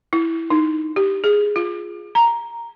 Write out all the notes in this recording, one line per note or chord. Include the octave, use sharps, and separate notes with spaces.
E4
D#4
G4
G#4
F4
A#5